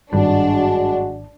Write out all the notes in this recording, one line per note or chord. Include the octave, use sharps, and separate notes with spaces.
G#1 G2 F#3 G#3 D4 F#4